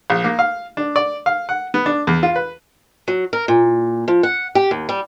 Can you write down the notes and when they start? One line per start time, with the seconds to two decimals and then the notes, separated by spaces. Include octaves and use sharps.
0.10 A#1
0.24 A#3
0.39 F5
0.77 D4
0.96 D5
1.26 F5
1.49 F#5
1.74 B3
1.86 D4
2.07 E2
2.23 F4
2.36 B4
3.08 F#3
3.33 A#4
3.48 A#2
4.08 F3
4.23 F#5
4.55 G4
4.71 D#2
4.89 G3